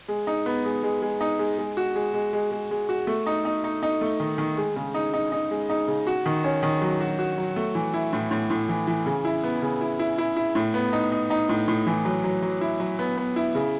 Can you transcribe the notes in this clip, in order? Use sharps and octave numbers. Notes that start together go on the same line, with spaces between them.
G#3
D#4
B3
G#3
G#3
G#3
D#4
G#3
G#3
F#4
G#3
G#3
G#3
G#3
G#3
F#4
A3
D#4
D#4
D#4
D#4
A3
D#3
D#3
G#3
C#3
D#4
D#4
D#4
G#3
D#4
C#3
F#4
D#3
C#4
D#3
F#3
F#4
F#4
F#3
A3
E3
E4
A2
A2
A2
E3
E3
C#3
E4
B3
C#3
E4
E4
E4
E4
A2
B3
D#4
D#4
D#4
A2
A2
E3
F#3
F#3
F#3
E4
F#3
B3
B3
E4
C#3